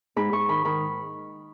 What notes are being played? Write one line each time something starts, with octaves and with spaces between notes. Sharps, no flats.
G#2 B5
G#2 C#6
D#3 B5
D#3 B5